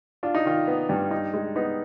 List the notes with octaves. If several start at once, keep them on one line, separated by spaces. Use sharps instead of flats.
D4 F4
D#4
D#3 F4
B3
G2
D#4
G#3
B3 D#4